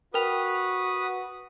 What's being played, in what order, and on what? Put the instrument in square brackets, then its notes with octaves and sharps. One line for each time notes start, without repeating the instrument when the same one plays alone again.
[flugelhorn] F#4 [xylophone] A#4 G5 F7 [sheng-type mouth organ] B4 D#6